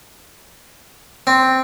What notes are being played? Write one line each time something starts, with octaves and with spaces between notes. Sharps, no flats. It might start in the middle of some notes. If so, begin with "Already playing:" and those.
C4